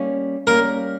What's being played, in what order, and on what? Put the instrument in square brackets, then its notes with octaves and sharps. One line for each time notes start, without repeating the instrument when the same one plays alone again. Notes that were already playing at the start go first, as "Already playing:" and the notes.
Already playing: [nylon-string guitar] G3 A#3 C#4
[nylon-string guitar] G3 A#3 C#4 [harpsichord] A#4